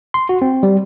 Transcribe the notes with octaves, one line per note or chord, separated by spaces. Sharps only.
C6
F#4
C4
G3